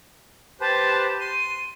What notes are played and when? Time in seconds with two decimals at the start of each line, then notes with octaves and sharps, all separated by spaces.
0.61 G4 B4 C5 A5
1.20 C6 D#7